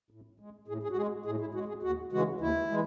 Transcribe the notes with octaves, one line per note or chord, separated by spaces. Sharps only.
A2
G#3
A2 G#4
G#4
F#4
G#3 G#4
A2 G#4
E4
G#3 F#4
G#4
D#2 F#4
C#3 E3 G#3 F#4
D#2 E4
E3 G#3